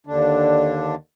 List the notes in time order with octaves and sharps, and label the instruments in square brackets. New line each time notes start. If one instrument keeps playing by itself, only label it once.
[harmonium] D#2 D3 D4